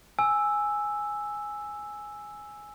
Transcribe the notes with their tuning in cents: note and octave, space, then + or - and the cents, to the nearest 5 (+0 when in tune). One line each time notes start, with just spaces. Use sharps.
G#5 +0 E6 +0